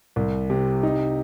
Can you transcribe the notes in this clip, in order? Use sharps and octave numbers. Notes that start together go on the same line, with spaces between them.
C2
C3
D#4